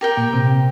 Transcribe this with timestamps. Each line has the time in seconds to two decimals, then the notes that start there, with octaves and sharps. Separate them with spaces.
0.01 G4 A#4 G5
0.17 A#2 A#3
0.33 C3 C4